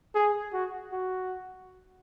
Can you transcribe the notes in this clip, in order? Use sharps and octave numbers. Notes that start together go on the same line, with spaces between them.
G#4
F#4
F#4